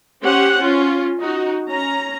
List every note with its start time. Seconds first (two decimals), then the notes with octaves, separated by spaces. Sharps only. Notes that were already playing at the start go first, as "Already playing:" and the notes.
0.23 C#4 G4 C5 F#5
0.59 C#4 F4
1.19 D#4 F#4
1.68 C#4 A#5